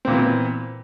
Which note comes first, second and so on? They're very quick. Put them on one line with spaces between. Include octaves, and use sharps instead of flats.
C4 A#2 E3 B3